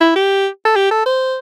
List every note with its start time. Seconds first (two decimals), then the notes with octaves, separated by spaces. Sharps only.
0.01 E4
0.16 G4
0.65 A4
0.76 G4
0.91 A4
1.06 C5